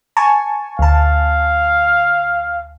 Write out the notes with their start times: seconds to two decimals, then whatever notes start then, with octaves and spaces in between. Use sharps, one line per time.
0.17 G#5 A5 C#6
0.79 D2 F5 A5